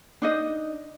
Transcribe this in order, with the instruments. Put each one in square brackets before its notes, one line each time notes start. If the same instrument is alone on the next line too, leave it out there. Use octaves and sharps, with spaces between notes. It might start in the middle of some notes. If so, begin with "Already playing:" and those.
[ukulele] D4 D#4 D#5